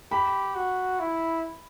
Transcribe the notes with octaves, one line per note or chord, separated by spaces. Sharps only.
G4 B5
F#4
E4